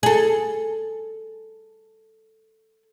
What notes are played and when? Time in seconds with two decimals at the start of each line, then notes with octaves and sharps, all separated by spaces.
0.03 G#4 A4